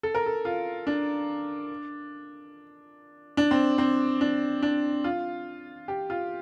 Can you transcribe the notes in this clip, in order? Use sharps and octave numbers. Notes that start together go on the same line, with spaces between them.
A4
A#4
A4
F4
D4
D4
C4
C4
D4
D4
F4
G4
F4